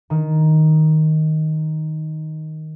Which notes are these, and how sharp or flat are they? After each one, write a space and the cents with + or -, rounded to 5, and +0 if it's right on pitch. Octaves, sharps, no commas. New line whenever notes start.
D#3 +5